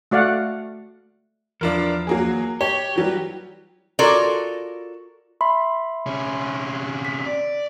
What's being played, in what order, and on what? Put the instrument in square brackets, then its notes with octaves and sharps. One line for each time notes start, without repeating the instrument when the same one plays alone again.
[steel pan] A3 F#4 D5 F5 F#5
[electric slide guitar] E2 F3 [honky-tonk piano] D4 F4 A#4
[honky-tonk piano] F#3 A#3 G#4
[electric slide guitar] G4 [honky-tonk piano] C#5
[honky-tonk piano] E3 F#3 G3
[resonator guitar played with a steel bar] F4 F#4 A4 A#4 C#5 D5
[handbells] E5 B5 C6
[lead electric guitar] C3 C#4
[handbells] B6
[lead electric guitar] D5